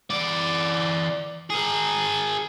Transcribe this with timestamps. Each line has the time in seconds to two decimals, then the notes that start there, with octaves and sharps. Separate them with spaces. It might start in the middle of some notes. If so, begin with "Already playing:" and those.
0.10 E3 D5
1.50 G#4 A#4